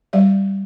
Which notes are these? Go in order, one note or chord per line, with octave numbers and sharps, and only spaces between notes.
G3 D5 E5